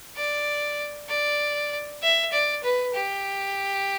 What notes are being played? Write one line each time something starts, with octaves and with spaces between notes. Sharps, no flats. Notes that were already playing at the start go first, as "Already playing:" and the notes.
D5
D5
E5
D5
B4
G4